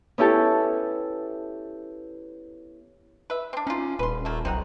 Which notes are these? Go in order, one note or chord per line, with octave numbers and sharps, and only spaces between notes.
B3 C#4 E4 G4 A4
B4 E5
C4 D4
C#4 D#4 F4
D#1 B4 C6
A3 A#3
B1 C4 D#4 F#5